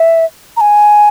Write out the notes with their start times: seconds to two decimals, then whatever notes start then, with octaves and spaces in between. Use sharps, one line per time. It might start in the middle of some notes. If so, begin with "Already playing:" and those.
Already playing: E5
0.57 A#5
0.61 G#5